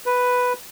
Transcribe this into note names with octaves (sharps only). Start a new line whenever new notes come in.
B4